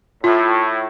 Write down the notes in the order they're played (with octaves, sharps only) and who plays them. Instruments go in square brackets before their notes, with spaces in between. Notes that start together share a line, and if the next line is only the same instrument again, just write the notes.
[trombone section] A2 [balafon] F4